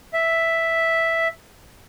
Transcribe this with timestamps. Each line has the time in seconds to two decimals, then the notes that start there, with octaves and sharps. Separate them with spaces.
0.13 E5